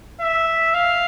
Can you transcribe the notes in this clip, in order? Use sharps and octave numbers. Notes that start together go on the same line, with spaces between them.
E5
F5